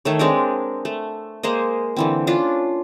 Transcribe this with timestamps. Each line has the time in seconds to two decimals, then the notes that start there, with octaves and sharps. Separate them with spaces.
0.05 D#3 A3 C#5
0.19 G#3 C4 D4 A#4
0.85 A3
1.43 G#3 A#3 C5 D#5
1.97 D3 E3 C4
2.27 C#4 D4 F4